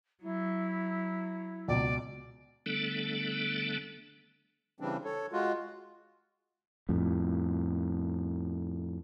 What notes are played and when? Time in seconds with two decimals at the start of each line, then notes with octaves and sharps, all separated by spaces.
0.22 F#3 E4
1.68 C#2 B2 D5
2.66 D3 G3 A3 B3 D4 A4
4.80 C#3 E3 G3 C4 D4
5.04 A4 C#5
5.33 G#3 F4 F#4
6.89 F2 A2